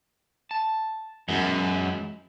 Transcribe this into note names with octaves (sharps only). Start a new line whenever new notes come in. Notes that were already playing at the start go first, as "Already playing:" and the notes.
A5
F#2 E3 G#3 E4